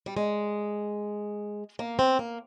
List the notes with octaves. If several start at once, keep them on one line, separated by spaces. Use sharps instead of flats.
G3
G#3
A#3
C4
A#3